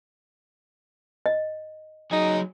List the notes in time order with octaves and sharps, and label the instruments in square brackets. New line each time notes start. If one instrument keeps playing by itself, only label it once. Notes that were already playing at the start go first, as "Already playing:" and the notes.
[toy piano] D#5
[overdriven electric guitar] F#3 G#4 [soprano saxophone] D#4